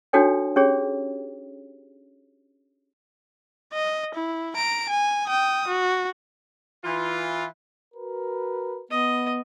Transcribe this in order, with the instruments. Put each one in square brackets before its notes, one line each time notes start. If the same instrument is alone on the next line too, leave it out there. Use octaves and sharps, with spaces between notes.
[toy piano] D4 D#4 F#4 A4 C#5 G5
C#4 G4 G#4 C#5
[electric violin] D#5
E4
A#5 D7
G#5
G5 D#6
F#4
[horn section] E3 F4
[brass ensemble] F#4 A#4 B4
[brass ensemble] B3 [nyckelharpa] D#5